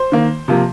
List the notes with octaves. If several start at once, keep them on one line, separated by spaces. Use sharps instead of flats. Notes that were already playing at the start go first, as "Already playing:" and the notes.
Already playing: C5
D#3 A#3
C3 F3 A#3